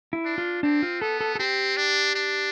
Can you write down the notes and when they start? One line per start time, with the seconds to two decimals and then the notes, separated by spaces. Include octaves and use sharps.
0.13 E4
0.26 D4
0.38 F4
0.63 C4 D4
0.82 F4
1.01 B3 A4
1.21 A4
1.35 A4
1.40 C4 G4
1.77 D4
2.16 D4